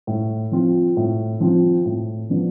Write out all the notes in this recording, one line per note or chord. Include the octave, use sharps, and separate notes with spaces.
A2
F3 C4 F4
A2
F3 C4 F4
A2
F3 B3 D4